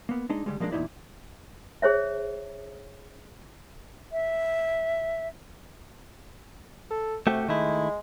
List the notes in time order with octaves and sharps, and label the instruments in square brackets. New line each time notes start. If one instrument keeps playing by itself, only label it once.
[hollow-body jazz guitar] A#3 B3
G#3 D4 D#4 D#5
D3 E3 G3 G#3
F3 G#3 A#3 C4 D4
E2 A#2 A#3 D#4 E4 D5
[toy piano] G#4 C5 C#5 E5
[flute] E5
[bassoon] A4
[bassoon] C3 [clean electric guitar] A3 F#4 G4
[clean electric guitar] D#3 A3 E4 [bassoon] G#3